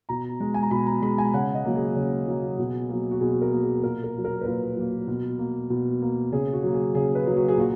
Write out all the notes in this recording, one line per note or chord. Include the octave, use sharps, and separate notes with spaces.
B2 A#5
G#3
G#5
A#5
B2 B5
A#5
G#3 B5
G#5
C#3 F#5
D#5
F#3 A#3
G#4
C#3
F#3 A#3
B2
F#3 A#3
F#4
B2 G#4
A#4
F#3 A#3
G#4
A#2 A#4
A#4
F#3 A#3
A#4
B4
A#2 A#4
F#3 A#3
B2
A#3
B2
A#3
C#3 G#4
F#4
F#3 A#3
G#4
C#3 G#4
B4
F#3 A#3
F#4
G#4
A#2 F#4